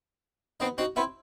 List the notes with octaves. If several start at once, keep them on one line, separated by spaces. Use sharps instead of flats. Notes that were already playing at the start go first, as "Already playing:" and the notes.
B3 C4 D#4
C4 D#4 F#4
B3 C4 E4